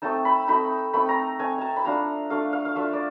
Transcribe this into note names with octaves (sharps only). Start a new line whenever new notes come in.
A3 C4 D#4 A5
B5
A3 C4 D#4 B5
A3 C4 D#4 B5
A#5
A3 C4 D#4 G#5
A5 A#5
B5
A3 D4 F4 A#5
A3 D4 F4 F5
F5
F5
A3 D4 F4 E5
D5